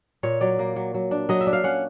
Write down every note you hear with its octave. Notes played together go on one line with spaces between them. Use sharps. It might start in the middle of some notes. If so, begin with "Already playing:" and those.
A#2 C#5
F#3 D5
A#3
F#3
F#3
D4
F#3 D#5
E5
D4
F5
C#4 F#5